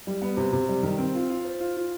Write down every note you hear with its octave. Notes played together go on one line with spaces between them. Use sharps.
G3
B3
C3
C3
G3
D#3
C4
F4
F4
C5
F4
F4